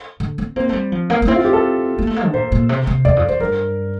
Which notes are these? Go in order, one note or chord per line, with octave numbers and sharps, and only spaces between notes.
D3
C4
A#3 C4
A3
G3
F3
A#3
A#3
C4 E4
F4
G4
A4
A#3
A3
A#3
D3
A#2 C5
A#2
C3
C3
E2 D5
F2
F2 C5
G2 A#4